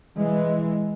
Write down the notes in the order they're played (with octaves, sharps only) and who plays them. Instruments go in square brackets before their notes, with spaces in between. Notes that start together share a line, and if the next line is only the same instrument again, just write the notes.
[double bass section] E3 G#3